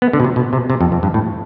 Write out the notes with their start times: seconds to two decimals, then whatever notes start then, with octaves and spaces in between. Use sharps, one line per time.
0.02 B3
0.13 D3
0.20 B2
0.24 C3
0.36 B2
0.53 C3
0.70 C3
0.81 F2
0.92 F2
1.03 G2
1.14 A2